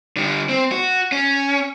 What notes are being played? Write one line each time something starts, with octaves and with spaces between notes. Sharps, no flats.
D3 G3
C4
F#4
C#4